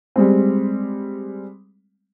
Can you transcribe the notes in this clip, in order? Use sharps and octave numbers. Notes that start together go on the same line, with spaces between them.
G3 G#3 C4